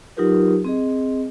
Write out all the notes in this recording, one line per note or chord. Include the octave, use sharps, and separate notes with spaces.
F#3 D#4 F4 G4 A#4 B4
C4 G#4 D#5